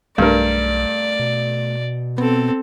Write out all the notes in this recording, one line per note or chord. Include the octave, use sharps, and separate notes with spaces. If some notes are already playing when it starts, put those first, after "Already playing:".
B1 G2 A3 A#4 D5
B2
B3 C4 A4